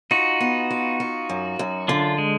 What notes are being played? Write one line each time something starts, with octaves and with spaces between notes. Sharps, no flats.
D#4 F4 F#4
B3
F4
F4
F#2
F#2
D3 D4 F4
G#3